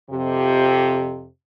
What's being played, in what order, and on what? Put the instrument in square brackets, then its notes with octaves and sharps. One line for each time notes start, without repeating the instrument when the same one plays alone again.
[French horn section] F2 C3 G4